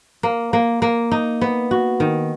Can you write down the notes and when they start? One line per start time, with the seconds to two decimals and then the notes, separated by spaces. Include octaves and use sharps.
0.23 A#3
0.53 A#3
0.82 A#3
1.11 D#4
1.41 B3
1.71 F#4
2.00 D#3